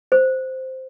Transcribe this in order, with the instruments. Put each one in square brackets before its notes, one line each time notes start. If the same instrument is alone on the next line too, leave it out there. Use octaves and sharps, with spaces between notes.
[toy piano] C5